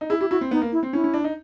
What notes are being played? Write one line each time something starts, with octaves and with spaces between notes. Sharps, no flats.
D#4
E4 G#4
E4 G4
E4 F#4
C4
B3 D#4
A#3
E4
C4
C#4 E4
C#4
D4
D#4